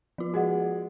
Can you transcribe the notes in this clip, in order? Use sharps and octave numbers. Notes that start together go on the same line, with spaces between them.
F3 F4
G#3 F#4 D#5 F#5